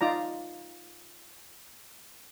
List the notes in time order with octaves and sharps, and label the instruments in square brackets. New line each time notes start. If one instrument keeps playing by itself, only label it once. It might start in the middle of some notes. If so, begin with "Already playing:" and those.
[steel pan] D#4 F4 D5 A#5